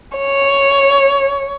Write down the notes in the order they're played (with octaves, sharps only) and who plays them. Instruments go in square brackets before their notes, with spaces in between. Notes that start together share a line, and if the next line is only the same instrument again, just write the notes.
[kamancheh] C#5